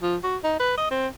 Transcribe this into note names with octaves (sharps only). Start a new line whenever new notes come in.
F3
F#4
D#4
B4
D#5
C4